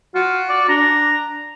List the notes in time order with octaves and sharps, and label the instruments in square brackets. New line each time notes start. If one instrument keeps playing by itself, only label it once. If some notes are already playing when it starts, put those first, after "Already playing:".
[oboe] F4 [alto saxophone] F#4
[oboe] D5
[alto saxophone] D4 [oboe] A#5